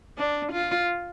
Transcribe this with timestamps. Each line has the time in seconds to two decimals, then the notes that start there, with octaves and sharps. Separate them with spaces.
0.18 D4
0.53 F4